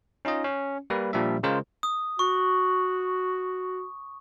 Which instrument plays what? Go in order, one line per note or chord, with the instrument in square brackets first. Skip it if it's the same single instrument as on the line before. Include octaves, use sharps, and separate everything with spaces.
[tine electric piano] C#4 D#4 F4 D#5
C#4
G3 A#3 B4
A#2 F3 G3 D4 E5
C#3 G#3 F4 A#4 C5
[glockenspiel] D#6
[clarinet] F#4 [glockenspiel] C#6